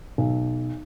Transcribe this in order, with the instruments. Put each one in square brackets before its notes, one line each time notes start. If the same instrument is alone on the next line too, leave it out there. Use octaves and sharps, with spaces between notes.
[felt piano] B1